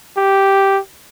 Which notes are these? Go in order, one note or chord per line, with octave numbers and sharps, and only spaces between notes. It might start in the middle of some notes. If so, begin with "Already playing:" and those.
G4